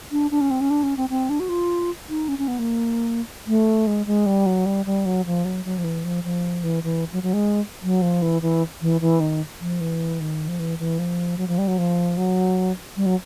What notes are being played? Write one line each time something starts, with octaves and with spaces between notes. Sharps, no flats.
D4
D4
C#4
C4
C#4
D4
C#4
C4
C4
D4
F#4
F4
D#4
C#4
C#4
B3
A#3
A3
G#3
G#3
G3
F#3
G3
G3
F#3
F3
F#3
F#3
F3
E3
F3
F3
E3
E3
F#3
F#3
G#3
F#3
F3
E3
E3
E3
E3
D#3
F3
E3
D#3
F3
E3
E3
F3
F#3
F3
G3
F#3
F3
F#3
G3
F#3